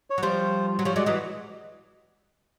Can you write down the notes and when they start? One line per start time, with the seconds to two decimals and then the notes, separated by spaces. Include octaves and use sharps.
0.10 C#5
0.18 F#3
0.22 F3 G3 C5
0.79 F#3
0.85 F3 G3 C#5
0.96 F#3 G#3 D5
1.06 E3 F#3 D#5